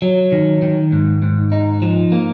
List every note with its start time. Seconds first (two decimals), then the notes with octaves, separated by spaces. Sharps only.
0.02 F#3
0.32 D#3
0.62 D#3
0.92 G#2
1.22 G#2
1.52 D#4
1.82 F3
2.12 A#3